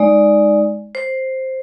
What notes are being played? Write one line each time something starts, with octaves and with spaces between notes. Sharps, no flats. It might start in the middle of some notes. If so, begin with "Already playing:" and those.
Already playing: G#3 D#4 D5
C5